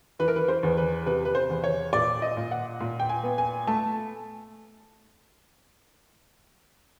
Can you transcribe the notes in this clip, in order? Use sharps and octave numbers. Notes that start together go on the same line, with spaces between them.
E3 B4
A#4
B4
C5
E2
B4
C3 B4
B4
C5
E2
C#5
A#2 D5
D#5
A#2
F#5
A#2
G5
G#5
B3
G#5
A3 A5